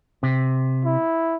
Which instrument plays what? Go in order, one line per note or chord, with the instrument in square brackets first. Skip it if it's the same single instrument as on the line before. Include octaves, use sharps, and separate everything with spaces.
[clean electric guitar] C3
[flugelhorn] E4